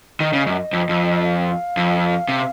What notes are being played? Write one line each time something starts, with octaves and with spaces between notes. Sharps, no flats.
D#3 D#5
C#3
F#2
F2
F2
F5
F2
C3